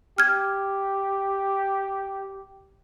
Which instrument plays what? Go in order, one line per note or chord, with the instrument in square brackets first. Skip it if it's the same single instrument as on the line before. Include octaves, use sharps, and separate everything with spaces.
[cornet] G4 [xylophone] F6 G#6